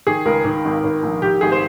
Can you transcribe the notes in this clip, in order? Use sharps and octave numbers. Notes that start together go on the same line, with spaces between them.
D#3 G#4
C#2 A#4
D#3
G#1
D#3
A#1
D#3 G4
G#1 G#4
C5